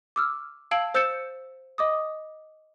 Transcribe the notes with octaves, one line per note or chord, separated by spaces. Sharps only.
D6 E6 F6
F5 A5 E6 G#6 D7 F#7
C5 E6 G6 A6 C#7 E7
D#5 D6 D#6